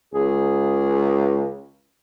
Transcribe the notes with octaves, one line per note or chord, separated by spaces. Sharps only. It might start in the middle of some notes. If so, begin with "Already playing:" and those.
C#2 G#4